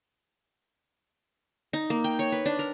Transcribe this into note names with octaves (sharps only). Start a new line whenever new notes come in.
D#4
A#3
G5
C#5
B4
D4
A#4